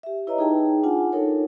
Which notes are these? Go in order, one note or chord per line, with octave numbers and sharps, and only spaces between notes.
G4 E5
E4 B4 C#5 D#5 A#5
D#4 G#4 G5 A5
D4 F4 F#5 G#5 A5
D4 D#4 A4 A#4 C#5